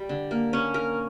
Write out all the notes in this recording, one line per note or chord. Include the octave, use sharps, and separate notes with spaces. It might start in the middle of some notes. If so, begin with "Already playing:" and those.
Already playing: G3
D3
A#3
C#4
A#4